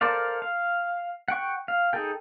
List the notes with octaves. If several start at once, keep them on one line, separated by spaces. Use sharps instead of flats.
A4 A#4 C5 D5 F5
F5
F#5 G5 C#6
F5
D#4 G#4 A4 G5